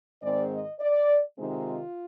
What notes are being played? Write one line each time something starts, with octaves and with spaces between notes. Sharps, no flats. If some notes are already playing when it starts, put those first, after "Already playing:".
G#2 D#3 G#3 C4 D5
D#5
D5
C3 D#3 G#3 C4 D#4 F4